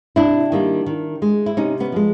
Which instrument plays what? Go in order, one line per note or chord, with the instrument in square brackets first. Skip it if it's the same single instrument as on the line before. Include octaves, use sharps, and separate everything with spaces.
[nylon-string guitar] C3 D4 E4
D#3 G3 A#3
D#3
G#3
E4
C3 C#4 D#4
B3 C#4
F3 G#3